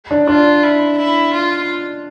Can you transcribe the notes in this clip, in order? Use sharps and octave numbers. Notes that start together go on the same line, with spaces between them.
D4
D4 F4
E4
E4
F4